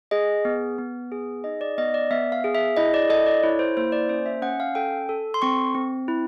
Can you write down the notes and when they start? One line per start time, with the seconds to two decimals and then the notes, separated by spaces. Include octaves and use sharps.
0.11 G#4 D#5
0.45 B3
0.78 B3
1.12 G#4
1.44 D#4 D#5
1.61 D5
1.78 B3 D#5
1.94 D5
2.11 B3 E5
2.32 F5
2.44 G#4
2.55 E5
2.77 E4 D#5
2.94 D5
3.09 A4 D#5
3.26 D5
3.43 E4 C#5
3.59 C5
3.77 A#3 C5
3.92 D5
4.09 C#4 C5
4.26 E5
4.42 C#4 F#5
4.60 F5
4.75 A4 G5
5.09 A4
5.34 C6
5.42 C4 C#6
5.75 C4
6.08 E4